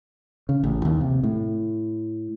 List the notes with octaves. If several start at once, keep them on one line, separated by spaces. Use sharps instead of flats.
C#3
A1
D#2
C3
A2